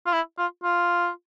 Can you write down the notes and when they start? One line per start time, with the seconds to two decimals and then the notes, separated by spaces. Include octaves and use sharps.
0.07 F4
0.13 E4
0.38 F4
0.64 F4